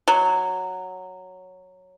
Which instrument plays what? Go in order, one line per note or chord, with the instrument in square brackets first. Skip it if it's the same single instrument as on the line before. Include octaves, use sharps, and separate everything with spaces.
[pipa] F#3